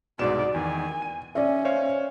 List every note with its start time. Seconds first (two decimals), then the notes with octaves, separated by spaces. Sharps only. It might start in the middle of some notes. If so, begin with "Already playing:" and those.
0.19 C2 G#2 B2 F#4 D5 E7
0.54 E2 D#3 G#5
1.02 D#7
1.35 C#4 D5 E5
1.65 C5 C#5 F5